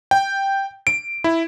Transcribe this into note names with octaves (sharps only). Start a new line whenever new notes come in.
G5
D7
E4